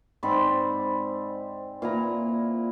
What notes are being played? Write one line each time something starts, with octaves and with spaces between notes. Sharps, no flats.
G#2 C4 D5 B5
A#2 E4 A#5